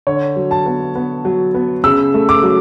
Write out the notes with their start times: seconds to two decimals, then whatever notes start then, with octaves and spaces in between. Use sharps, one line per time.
0.07 D3 C#5
0.36 F#3
0.51 A5
0.66 B3
0.95 B3
1.25 F#3
1.54 B3
1.84 C#3 E6
2.14 A3
2.29 D6
2.43 F#3